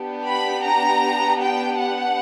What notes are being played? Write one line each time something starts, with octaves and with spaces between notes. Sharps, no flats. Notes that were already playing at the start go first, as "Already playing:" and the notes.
Already playing: B3 D4 G4
B5
A#5
G5
F#5